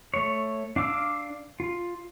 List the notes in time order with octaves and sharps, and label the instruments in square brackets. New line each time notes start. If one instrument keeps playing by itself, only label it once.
[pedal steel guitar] A3 C#5
D4 F5 D6 E6
F4